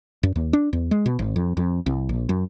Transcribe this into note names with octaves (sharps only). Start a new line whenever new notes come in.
F#2
D#2
D4
E2
G#3
B2
G#1
F2
F2
C2
A#1
F#2